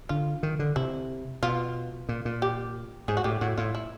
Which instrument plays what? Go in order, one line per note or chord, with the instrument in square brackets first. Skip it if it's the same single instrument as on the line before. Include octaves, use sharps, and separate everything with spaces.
[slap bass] D3 [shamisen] F4
[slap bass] D#3
D3
[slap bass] C3 [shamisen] E4
[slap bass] B2 [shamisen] F4
[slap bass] A#2
A#2
[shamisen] G4
[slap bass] G#2 [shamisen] G#4
[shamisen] F#4
[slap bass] A2 [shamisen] G4
[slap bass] A2 [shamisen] F#4
[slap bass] A2 [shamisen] F4
[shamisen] E4